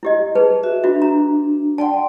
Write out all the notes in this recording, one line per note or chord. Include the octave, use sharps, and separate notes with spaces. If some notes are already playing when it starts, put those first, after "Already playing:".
E4 G4 D#5
G#4 B4 A5
F#4 E5
D4 F4 F#4 E5
A#5
D5 F#5 G5 A5 C6